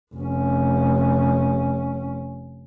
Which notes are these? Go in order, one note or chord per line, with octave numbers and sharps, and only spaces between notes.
F1 C#4